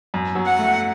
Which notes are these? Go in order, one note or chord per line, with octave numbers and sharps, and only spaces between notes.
F#2
F#3
F#5
A3